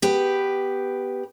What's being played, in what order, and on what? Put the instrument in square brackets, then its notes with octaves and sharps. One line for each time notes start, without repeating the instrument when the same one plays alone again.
[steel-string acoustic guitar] B3 G4 B4